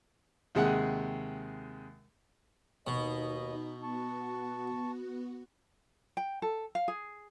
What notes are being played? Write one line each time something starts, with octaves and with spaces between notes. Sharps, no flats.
D#2 C3 G#3 G#4 F#5
D#2 B2 D#4 D#5
B3 F#4 A5 C#6
G5
A4
F5
G#4